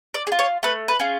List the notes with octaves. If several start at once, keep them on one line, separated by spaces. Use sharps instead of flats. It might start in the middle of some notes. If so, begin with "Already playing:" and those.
D5
G#4
F4
C#5
A3 B4
B4
C#4 F4 G#4